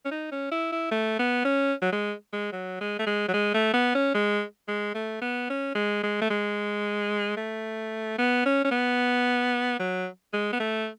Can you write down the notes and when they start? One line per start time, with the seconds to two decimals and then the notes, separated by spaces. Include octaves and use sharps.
0.05 C#4
0.11 D#4
0.32 C#4
0.51 E4
0.72 E4
0.91 A3
1.19 B3
1.45 C#4
1.82 F#3
1.92 G#3
2.33 G#3
2.53 F#3
2.81 G#3
2.99 A3
3.06 G#3
3.28 F#3
3.34 G#3
3.54 A3
3.74 B3
3.95 C#4
4.14 G#3
4.68 G#3
4.95 A3
5.22 B3
5.50 C#4
5.75 G#3
6.03 G#3
6.21 A3
6.30 G#3
7.37 A3
8.19 B3
8.45 C#4
8.64 C#4
8.71 B3
9.80 F#3
10.33 G#3
10.53 B3
10.60 A3